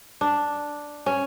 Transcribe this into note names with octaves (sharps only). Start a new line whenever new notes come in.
D4
C#4